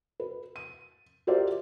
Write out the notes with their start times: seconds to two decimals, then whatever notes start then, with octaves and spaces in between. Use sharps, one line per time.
0.20 B4
0.56 D#7
1.27 F4 G4 A#4 C5 D5 E5